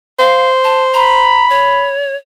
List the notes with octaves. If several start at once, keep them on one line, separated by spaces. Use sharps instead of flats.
C5 F5
A5
A#5 B5
C#5